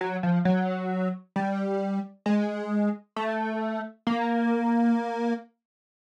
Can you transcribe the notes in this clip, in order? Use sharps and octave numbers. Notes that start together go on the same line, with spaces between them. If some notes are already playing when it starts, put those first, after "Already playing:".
F#3
F3
F#3
G3
G#3
A3
A#3